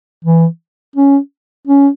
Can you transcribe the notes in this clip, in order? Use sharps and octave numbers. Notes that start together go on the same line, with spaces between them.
E3
C#4
C#4